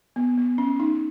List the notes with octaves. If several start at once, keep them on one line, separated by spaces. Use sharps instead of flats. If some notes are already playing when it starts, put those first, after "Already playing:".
B3
B3
C#4
D#4